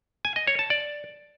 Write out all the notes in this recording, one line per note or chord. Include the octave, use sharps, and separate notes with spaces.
G#5
D#5
C#5
A5
D5